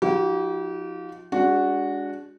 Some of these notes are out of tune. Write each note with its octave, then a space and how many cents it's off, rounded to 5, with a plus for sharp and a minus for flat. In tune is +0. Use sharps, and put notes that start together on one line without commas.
F3 +30 D#4 +45 G4 -35
G#3 -30 D4 -25 F#4 -5